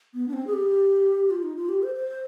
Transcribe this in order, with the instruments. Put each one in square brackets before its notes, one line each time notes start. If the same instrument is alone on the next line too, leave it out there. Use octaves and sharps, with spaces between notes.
[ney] B3
D4
C4
G#4
G4
F4
D#4
F4
G4
C5
C5